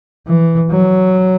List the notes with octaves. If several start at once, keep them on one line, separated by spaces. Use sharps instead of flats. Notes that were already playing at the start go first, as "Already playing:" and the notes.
E3
F#3